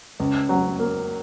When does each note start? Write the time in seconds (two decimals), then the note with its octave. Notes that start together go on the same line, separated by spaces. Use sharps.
0.20 C#2
0.49 F#3
0.79 A#3